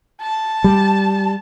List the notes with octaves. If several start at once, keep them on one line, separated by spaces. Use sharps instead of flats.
A5
G3